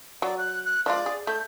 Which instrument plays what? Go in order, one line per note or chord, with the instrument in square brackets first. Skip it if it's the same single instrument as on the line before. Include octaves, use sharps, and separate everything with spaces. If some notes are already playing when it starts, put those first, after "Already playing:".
[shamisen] F#3 [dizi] D5
[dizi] F#6
F#6
[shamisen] F3 G#3 F4 [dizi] D5
[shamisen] G#4
[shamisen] A3 [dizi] G6